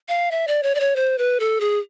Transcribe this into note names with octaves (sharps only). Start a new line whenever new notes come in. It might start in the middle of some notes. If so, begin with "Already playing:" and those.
F5
E5
D5
C#5
D5
C#5
C5
B4
A4
G#4